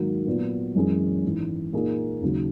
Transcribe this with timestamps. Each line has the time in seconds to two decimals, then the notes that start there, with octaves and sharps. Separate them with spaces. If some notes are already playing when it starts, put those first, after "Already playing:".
Already playing: G#2 D#3 F#3 A#3
0.26 A#2 F#3 B3
0.75 F#2 E3 G#3 C#4 G#4
1.24 G#1 G#2 E3
1.73 A#2 A#3 D#4 G#4
2.22 D#2 C#3 F#3